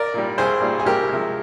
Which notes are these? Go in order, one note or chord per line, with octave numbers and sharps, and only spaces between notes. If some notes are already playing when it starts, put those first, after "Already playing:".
Already playing: A#4 D5
A#2 G3
C2 G#4 C5
A#2 G3
G#4
C2 G4 A#4
C3 F3 G#3